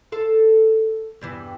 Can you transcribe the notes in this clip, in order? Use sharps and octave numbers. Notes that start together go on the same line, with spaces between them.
A4 F5
E2 G2 E3